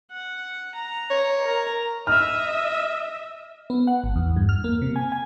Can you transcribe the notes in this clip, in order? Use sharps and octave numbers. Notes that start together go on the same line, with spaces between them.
F#5
A#5
C#5
A#4 A#5
D#5 E5 F6
B3
F#5
G#1
E2
G2
F6
A#3
C3
G#5
G#5